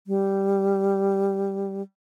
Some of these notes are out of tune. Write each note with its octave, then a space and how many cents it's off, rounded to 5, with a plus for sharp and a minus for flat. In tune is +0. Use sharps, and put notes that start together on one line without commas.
G3 +0